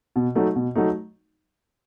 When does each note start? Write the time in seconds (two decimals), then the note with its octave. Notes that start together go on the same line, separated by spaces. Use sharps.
0.16 B2
0.35 F#3 A3 D#4
0.56 B2
0.76 F#3 A3 D#4